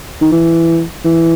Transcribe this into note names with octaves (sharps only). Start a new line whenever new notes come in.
D#3
E3
E3